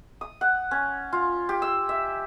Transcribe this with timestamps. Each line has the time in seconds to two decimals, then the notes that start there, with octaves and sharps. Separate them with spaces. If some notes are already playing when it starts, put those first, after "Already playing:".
0.21 D#6
0.41 F#5
0.71 C#4
1.13 F4
1.49 G4
1.62 E6
1.89 E5